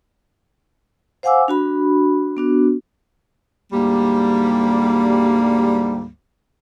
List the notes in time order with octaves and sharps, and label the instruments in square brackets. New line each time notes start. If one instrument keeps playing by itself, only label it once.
[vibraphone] C5 F5 F#5 G#5 D6 E6
D4 F#4 B5
B3 D4 F#4
[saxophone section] D2 G#2 G3 [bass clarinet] A#3